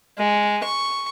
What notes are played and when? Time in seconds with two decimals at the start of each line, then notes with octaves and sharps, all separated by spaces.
0.18 G#3
0.64 C#6